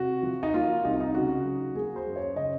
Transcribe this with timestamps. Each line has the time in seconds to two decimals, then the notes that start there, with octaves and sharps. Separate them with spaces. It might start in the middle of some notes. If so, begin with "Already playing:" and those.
Already playing: C3 F#4
0.23 F3
0.43 D#4
0.54 A#3 F4
0.85 C2 D#4
1.00 D#4
1.15 C#3 F#4
1.45 F#3
1.75 A#3 G#4
1.96 C5
2.06 F#2
2.16 C#5
2.36 C#3 D#5